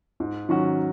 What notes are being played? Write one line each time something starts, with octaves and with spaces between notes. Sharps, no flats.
G#2
D#3 F#3 C#4 F#4